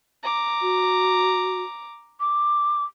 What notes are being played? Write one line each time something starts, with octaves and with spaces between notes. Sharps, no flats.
A#5 D6
F#4
D6